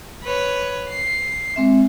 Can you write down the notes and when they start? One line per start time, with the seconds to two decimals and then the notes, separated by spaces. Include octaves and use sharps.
0.23 B4 C#5
0.89 C7
1.56 G#3 C4 E5